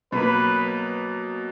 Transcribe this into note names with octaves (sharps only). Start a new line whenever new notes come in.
B2 F#3 A#3 B4